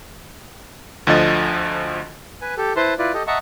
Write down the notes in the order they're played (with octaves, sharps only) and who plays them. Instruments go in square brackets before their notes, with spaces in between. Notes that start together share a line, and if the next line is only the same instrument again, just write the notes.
[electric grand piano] D2 D3 F3 D#5 A6
[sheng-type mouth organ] B4 G#5
G4 A4
E4 B4 C5 A5 C6
E4 F4 B4 D5
G4 A4 D#5
D#5 E5 F#5 A5 A#5 C#6